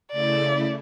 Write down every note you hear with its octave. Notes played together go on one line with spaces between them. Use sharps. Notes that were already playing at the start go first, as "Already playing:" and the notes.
C#3 A3 E4 D5